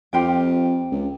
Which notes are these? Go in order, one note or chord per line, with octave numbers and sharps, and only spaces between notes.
F2 F4 G4 G5
C#2